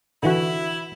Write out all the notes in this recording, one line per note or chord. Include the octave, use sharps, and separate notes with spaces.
D3 E3 E4 F#4